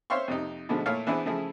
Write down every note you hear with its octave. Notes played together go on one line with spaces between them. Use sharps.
C5 C#5 E5 F5 C6 C#6
F2 C3 D#4
B2 D3 F3 G#3 A3
A#2 A3 E4 C#5 F5 F6
E3 B3 D4 E4 G#4 C5
C#3 F3 A3 E4 G#4